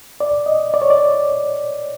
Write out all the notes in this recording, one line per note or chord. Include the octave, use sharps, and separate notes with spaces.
D5
D#5
D5
C#5
D5